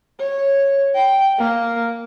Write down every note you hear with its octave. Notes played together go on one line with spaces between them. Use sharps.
C#5
G5
A#3